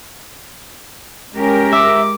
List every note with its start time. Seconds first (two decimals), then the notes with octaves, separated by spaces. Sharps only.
1.34 G#3 C#4 G4 A#4
1.73 E5 D6